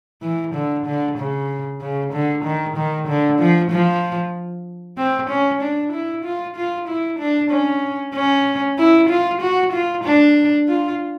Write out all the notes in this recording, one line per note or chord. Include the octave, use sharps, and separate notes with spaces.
E3
D3
D3
C#3
C#3
D3
D#3
D#3
D3
F3
F3
C4
C#4
D4
E4
F4
F4
E4
D4
C#4
C#4
E4
F4
F#4
F4
D4
F4